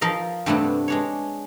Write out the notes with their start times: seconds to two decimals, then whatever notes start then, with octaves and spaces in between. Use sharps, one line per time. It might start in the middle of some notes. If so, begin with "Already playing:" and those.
0.01 F3 A#4 D#5 F5
0.46 G2 C3 A3 B3 C4 D4
0.88 G#3 D4 C#5